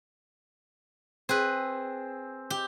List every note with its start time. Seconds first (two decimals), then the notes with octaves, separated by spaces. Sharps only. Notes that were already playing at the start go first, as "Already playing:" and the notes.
1.29 C4 G#4 B4
2.50 G4